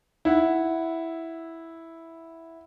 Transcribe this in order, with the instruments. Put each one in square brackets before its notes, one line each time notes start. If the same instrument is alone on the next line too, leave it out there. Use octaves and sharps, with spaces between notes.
[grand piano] E4 F#5